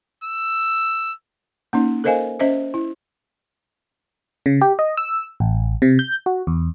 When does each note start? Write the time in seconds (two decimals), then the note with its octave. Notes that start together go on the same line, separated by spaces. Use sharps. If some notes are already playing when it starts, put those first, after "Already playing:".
0.24 E6
1.73 A#3 C#4 D#4
2.04 A4 A#4 C5 D#5 F5 G#5
2.40 C#4 C5 D#5 E5
2.74 E4
4.46 C#3
4.61 G4
4.79 D#5
4.97 E6
5.40 A1
5.82 C3
5.99 G6
6.26 F#4
6.47 E2